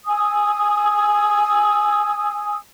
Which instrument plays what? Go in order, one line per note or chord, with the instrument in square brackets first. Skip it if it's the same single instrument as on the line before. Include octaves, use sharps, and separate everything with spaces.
[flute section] G#5 D#6 E6